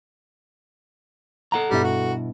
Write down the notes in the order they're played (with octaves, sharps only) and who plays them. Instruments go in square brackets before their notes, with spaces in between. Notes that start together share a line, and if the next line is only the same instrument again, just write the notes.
[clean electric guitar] A4 F#5 A#5
[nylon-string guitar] G2 B2 E4 [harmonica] G3
[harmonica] F#4